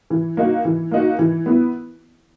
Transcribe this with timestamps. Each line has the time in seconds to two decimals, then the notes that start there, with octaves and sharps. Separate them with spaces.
0.10 E3
0.37 A#3 D#4 F#4
0.65 E3
0.91 A#3 D#4 F#4
1.19 E3
1.46 B3 E4